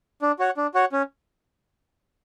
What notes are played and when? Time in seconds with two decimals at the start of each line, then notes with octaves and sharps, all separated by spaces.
0.22 D4
0.39 F#4 C#5 F#5
0.57 D4
0.74 F#4 C#5 F#5
0.92 C#4